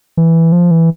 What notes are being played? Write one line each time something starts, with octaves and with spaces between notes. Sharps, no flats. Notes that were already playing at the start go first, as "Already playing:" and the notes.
E3
F3
E3